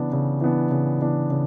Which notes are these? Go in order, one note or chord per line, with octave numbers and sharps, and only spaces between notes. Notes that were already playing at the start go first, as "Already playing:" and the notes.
Already playing: C#3 E3 B3 D4
C#3
E3 B3 D4
C#3
E3 B3 D4
C#3